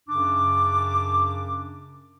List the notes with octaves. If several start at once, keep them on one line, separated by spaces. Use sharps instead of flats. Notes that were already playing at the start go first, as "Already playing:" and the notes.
F#2 C#3 D4 D6